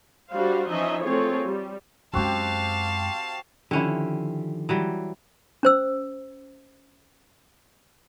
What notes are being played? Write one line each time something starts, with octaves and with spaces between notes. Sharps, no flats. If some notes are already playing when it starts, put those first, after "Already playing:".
G3 D4 F#4 C5 F5
E3 F3 C#4 D#4 D#5 E5
A3 C4 F4 G#4 C#5
G3
F#2 G#3 C4 F#4 G4 F5 A5
D3 D#3 F3 C#4 E4 G4
E3 F#3 G3
C#4 C5 E6